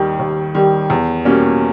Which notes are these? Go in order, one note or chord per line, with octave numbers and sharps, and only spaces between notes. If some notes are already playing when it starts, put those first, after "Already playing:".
Already playing: D#2 D#3 G3
D#2
D#3 G3
E2
B2 G3 A#3 C#4